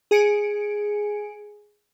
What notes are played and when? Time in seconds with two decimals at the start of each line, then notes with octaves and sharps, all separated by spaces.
0.11 G#4 G#5 C#7 D7